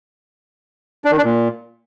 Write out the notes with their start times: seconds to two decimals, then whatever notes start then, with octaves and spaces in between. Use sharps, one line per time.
1.05 D4
1.11 D#3
1.18 D4
1.25 A#2